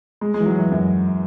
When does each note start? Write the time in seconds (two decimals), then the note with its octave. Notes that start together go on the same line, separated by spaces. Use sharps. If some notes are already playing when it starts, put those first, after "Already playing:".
0.21 G#3
0.34 G#3
0.40 E3
0.46 F#3
0.58 E3
0.71 F#2